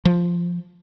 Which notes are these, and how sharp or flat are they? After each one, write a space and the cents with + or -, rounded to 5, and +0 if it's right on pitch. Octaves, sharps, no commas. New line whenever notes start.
F3 -5